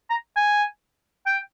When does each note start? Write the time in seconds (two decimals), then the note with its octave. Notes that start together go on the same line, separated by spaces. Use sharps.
0.10 A#5
0.36 G#5
1.26 G5